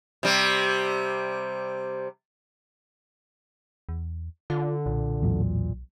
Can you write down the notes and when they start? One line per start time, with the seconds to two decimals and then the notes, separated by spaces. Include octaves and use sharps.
0.23 C3 G3
3.89 E2
4.50 D3 F4
4.86 B1 A#2
5.22 E2 A2 F#3